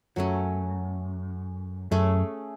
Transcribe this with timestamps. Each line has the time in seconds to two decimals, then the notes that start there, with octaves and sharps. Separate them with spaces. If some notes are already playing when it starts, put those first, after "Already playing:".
0.16 F#2 F#3 A3 C#4
1.91 F#2 A3 C#4 G#4